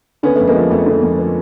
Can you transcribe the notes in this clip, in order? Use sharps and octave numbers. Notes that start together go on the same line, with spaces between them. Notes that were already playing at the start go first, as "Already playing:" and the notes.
D3 B3 C#4
A3 B3
F2
G#3 A#3
F3
F2 A3
D3
F2
F3